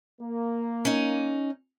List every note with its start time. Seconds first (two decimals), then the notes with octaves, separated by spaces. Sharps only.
0.21 A#3
0.85 C#4 D#4